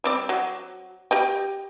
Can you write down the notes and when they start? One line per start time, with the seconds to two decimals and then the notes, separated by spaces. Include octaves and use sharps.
0.04 G3 C4 D5
0.29 F#3
1.11 G4 D#5 G5